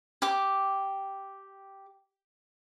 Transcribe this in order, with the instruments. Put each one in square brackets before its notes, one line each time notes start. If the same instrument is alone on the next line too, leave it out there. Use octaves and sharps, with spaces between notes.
[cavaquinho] G4 D6